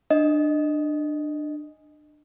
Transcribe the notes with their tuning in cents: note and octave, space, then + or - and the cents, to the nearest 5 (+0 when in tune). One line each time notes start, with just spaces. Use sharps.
D4 +25 D#5 +0